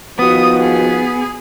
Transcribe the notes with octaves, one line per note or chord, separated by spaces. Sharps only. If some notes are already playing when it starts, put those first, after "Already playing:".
D#2 F3 B3 F#4 D#6
G#4